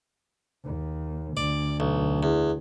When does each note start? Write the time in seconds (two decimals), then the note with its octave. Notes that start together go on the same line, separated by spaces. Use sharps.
0.64 D#2
1.37 D2 D5
1.80 B1
2.23 E2